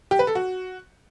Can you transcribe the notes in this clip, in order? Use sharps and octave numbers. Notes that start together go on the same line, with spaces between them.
G4
B4
A4
F#4